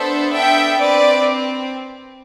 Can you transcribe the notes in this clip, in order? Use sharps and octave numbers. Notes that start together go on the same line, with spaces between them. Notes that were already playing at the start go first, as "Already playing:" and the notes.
Already playing: B3 D4 A4 C5 E5
E5 G5
C4 B4 D5